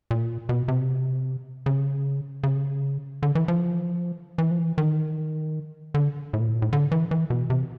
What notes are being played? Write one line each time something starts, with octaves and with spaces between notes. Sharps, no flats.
A#2
B2
C3
C#3
C#3
D3
E3
F3
E3
F3
E3
D#3
D3
A2
A#2
A2
A#2
A2
D3
E3
E3
B2
C3